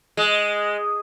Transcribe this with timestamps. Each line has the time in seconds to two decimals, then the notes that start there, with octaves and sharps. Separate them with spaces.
0.17 G#3